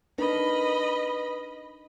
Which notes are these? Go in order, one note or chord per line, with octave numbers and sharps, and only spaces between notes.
D4 D#4 A#4 B4 D#5 B5